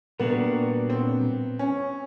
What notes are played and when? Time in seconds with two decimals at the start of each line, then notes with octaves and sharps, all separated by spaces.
0.19 A#2 G3 A#3 B3 D4 F#4
0.90 C4
1.59 C#4